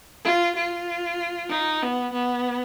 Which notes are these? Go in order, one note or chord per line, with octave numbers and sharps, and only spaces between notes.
F4
F4
D#4
B3
B3